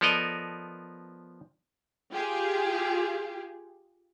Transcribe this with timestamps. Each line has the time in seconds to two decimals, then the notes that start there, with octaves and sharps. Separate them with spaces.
0.01 F3 B3 A4 A#4 D5 D#5
2.12 F4 G4 G#4